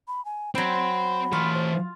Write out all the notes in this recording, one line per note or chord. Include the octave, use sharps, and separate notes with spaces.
B5
G#5
F#3 C4 G5 B5
E3 F4 C#5
C5